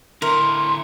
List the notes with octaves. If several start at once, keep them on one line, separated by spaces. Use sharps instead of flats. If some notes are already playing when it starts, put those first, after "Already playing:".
D3 E4 A#4 C6